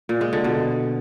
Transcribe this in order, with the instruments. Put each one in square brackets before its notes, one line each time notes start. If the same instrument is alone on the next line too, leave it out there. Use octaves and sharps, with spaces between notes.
[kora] A#2
G#3
D3
B2